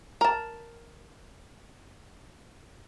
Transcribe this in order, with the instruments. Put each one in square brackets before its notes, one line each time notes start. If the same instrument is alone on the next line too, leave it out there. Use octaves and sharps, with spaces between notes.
[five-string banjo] A#4 A5